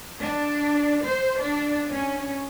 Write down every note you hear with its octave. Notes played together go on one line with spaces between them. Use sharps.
D4
C5
D4
C#4